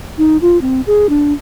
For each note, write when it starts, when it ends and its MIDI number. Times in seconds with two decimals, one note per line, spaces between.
0.18 0.37 63
0.41 0.60 65
0.61 0.81 60
0.87 1.09 68
1.09 1.33 62